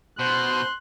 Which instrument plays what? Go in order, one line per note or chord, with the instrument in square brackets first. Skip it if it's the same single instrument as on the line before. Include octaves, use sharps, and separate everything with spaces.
[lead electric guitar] B2 [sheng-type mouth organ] C5 [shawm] C6 [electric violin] F#6